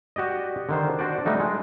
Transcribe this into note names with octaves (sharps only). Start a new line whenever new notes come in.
F#4 G4 D5 D#5
D3 D#3 C5
D4 F#4 C5 D5
G3 A3 D#4 F#4
G#3